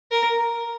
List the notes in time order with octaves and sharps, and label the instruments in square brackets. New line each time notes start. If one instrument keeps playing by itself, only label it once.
[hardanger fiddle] A#4